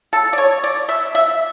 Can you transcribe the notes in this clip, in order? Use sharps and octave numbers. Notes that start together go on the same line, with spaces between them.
A4
D5
C#5
D5
E5
E5